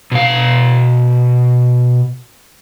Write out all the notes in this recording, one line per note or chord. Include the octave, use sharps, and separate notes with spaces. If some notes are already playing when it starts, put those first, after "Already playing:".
B2 F5